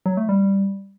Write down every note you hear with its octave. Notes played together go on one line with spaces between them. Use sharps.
F#3
A3
G3